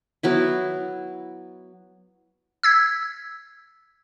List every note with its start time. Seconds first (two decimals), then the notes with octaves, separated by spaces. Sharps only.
0.23 F#3 B3 E4
2.63 E6 G#6 B6